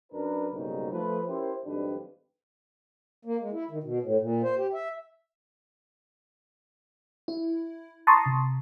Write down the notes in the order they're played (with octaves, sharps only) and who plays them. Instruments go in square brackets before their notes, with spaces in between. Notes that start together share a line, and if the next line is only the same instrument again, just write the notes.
[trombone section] F#2 D4 A#4 B4
B1 G#2 C#3 G3 A#3 D#4
F3 A3 B4
C#4 E4 G4 A#4 C5
G#1 F2 G3 D4 D#4 B4
[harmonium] A#3
G#3
E4
D#3
B2
A2
A#2
C5
G4
E5
[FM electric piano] E4
A5 A#5 C6 C#6 D#6
C3